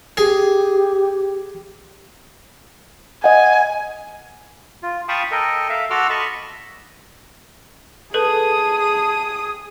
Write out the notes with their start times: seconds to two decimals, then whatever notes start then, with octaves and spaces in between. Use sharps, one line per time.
0.17 G4 G#4
3.24 D#5 F#5 G#5
4.82 F4
5.08 F5 G5 A5 B5 C#6 D#6
5.31 A4 A#4 D#5 G5
5.69 E5 F5
5.90 F#4 A4 C6 D6 E6 F6
6.10 D#5 A5 B5 C#6
8.14 G#4 A4 B4 A5 D#6